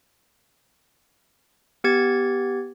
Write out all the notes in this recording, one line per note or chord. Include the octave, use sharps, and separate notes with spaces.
B3 G4 G#6 A6